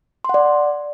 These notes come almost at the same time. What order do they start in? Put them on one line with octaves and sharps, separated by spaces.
C6 F#5 D5